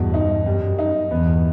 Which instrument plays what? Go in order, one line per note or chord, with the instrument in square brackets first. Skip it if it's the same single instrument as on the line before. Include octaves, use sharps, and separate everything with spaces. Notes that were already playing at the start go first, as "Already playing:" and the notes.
Already playing: [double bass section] E2 G2 [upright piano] B2
[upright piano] D#4
[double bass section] F#2 [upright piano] G3
[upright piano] D#4
[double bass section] E2 G2 [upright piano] B3